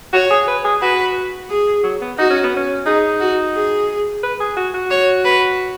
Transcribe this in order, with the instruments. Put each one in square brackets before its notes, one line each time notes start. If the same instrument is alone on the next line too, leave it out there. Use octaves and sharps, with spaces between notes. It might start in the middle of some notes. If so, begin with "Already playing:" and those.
[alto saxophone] F#4 [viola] C#5
[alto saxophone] G#4
B4
G#4
[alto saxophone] F#4 [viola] B4
[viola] G#4
[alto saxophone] F#3
B3
[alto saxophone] D#4 [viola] F#4
[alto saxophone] C#4
B3
C#4
[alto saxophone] D#4 [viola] G#4
[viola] F#4
G#4
[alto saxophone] B4
G#4
F#4
F#4
[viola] C#5
B4